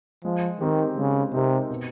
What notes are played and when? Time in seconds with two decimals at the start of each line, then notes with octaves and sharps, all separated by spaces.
0.24 F3 G#3
0.61 D#3 C4 D#4 G4 A#4
0.98 C#3 G#3
1.33 C3 C4 D#4 G4 A#4
1.70 B2